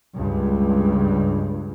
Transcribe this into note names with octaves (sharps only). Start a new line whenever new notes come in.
C#2 G2